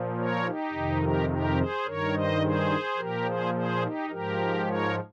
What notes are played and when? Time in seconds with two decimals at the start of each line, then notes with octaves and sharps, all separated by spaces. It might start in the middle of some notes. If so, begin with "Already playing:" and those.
Already playing: A#2 F3
0.17 A#4 C#5
0.45 D#4 G4
0.73 F2 C3 D#3
1.02 G4 A#4
1.29 G4 A#4
1.57 G#4 C5
1.85 G2 D#3 A#4 C#5
2.14 C5 D#5
2.42 G#4 C5
2.97 A#2 F3 G4 A#4
3.26 G#4 C5
3.54 G#4 C5
3.82 D#4 G4
4.09 G#2 F3 G4 A#4
4.66 A#4 C#5